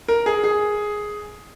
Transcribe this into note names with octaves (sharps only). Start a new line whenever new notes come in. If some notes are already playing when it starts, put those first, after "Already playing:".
A#4
G#4
G#4